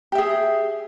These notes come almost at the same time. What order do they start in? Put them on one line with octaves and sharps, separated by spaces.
G4 E5 G#4